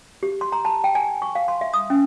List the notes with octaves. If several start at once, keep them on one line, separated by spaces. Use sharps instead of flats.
G4
C6
A#5
A5
G5
G#5
C#6
F5
C6
E5
D#6
C#4